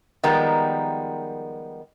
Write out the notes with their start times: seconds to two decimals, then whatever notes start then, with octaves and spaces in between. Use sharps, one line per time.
0.23 D#3 F3 G3 G#3 B3 A#4